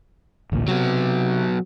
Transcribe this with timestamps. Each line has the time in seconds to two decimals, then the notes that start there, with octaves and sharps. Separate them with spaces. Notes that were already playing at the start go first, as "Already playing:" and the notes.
0.52 A1 D2 A#2
0.68 C3 F#3 B3